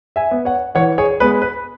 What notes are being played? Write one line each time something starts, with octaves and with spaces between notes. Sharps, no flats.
E5 G#5
B3
C#5 F#5
E3 C#5 F#5
G#4 C#5
G#3 B3 B4
B4